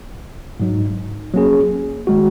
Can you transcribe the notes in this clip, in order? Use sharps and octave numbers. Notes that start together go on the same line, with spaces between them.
G#2 F#3 D#4
F#3 A#3 C#4 G#4
D#3 G#3 F#4